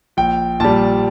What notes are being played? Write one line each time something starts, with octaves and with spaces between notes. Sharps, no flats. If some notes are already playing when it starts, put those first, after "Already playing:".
A#1 G5
A#2 G3 A5